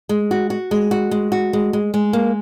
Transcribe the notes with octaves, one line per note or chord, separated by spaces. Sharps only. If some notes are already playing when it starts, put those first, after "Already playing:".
G#3
F#4
F#4
G#3
F#4
G#3
F#4
G#3
G#3
G#3
A#3